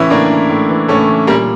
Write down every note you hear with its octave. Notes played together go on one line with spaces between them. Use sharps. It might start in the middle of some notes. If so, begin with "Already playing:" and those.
Already playing: A2 E3 C#4 E4
A2 A#3 D4
E3
A2
E3
A2 A3 C#4
E3
A#2 G3 A#3